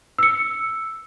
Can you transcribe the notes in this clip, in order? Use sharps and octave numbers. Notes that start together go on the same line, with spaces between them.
E6 C#7